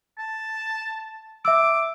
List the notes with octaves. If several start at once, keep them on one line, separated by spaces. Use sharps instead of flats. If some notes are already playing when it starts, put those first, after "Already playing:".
A5
E5 D6 E6